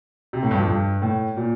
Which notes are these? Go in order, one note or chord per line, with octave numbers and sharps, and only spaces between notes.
C3
A2
G2
F2
G2
A2
A#2